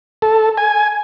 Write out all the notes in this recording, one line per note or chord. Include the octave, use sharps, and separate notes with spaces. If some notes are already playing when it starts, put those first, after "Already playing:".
A4
G#5